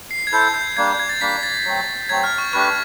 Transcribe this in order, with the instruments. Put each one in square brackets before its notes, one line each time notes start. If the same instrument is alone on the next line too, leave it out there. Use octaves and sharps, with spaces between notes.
[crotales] C7
G#6
[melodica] E4 A4 C5 [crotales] G6
[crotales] G6
[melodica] G3 A#3 D4 [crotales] G#6
[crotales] G6
G#6
A6
[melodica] G3 A#3 D4 [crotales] B6
[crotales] A6
[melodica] F#3 A3 C4
[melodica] F#3 A3 C4 [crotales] G#6
[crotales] F6
C#6
[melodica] A3 D4 G4 B4 [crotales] C#6